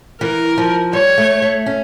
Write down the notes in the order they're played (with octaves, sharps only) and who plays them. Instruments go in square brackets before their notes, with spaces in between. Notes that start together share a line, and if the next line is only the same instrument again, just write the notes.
[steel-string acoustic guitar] E3 [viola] A#4
[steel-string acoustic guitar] F3
[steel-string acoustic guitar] G3 [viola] C#5
[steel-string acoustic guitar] A3
A3
C#4